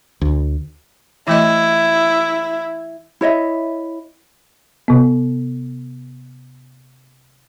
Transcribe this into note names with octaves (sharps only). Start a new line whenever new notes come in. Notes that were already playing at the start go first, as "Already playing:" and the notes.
D2
E3 A3 E4 D#5
E4 C#5 D#5 E5
C3 B3